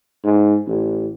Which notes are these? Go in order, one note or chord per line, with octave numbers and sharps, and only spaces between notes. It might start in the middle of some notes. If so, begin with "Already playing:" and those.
G#2
A1